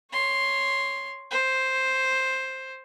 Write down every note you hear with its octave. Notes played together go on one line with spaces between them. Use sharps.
C#5 C6
C5